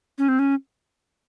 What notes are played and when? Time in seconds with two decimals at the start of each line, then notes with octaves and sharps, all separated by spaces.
0.18 C#4
0.29 C4
0.39 C#4